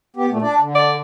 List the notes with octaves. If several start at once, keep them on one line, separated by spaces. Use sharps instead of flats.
B3 G4
A#2 A3
D4 D5
D3
D5